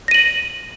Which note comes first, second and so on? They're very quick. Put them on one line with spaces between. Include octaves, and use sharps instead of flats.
A#6 D#7 F#7